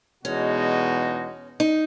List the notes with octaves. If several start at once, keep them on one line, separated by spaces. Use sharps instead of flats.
E2 B2 G#3 C#4 D#4 F#4
D#4